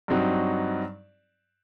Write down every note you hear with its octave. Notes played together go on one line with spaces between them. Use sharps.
G2 F#3 C4 D#4 F#4